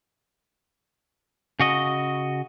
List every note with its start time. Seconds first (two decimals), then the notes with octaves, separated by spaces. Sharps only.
1.60 C#3 F#4 D#5